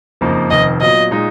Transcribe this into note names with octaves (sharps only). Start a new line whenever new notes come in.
F#1 F2 F3 A#3 D#4
F1 F2 D#3 D#5
A#2 F#3 B3 D#5
A#2 G#3 D#4